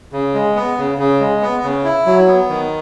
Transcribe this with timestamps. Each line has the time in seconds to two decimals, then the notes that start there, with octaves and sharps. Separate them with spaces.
0.13 C#3
0.34 G#3
0.56 B3
0.77 C#3
0.98 C#3
1.20 G#3
1.42 B3
1.63 C#3
1.84 E4
2.06 F#3
2.27 B3
2.49 D#3